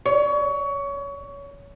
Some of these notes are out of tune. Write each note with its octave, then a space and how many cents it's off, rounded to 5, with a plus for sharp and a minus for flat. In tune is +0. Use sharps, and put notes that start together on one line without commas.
C#5 +25